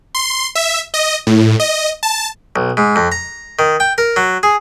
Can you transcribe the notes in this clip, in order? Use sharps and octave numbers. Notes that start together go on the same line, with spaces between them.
C6
E5
D#5
A2
D#5
A5
B1
G#2
F2
A#5
D#3
G5
A#4
F#3
G#4